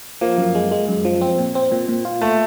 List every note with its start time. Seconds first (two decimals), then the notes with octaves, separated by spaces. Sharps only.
0.21 F3 A#3
0.38 F#2
0.55 G#3
0.71 G#3
0.89 F#2
1.05 F3
1.21 C4
1.38 A#2
1.55 C4
1.72 A#2
1.89 A#2
2.05 F4
2.22 A3